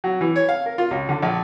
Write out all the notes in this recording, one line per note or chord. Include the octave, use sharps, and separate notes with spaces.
F#3
E3
C#5
F5
A#4
F4
C#2
D3
A#1